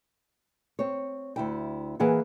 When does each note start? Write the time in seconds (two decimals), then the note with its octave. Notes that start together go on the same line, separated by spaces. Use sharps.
0.79 C4 C#5
1.36 D2 E4 G5
2.00 E3 A#3 G#4 F#5